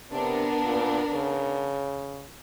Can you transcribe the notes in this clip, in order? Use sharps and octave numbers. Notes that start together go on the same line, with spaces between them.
C3 B3 D4 A#4
A#2
C#3